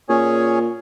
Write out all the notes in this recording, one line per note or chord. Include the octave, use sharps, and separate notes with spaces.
A#2 C#4 G#4 C#5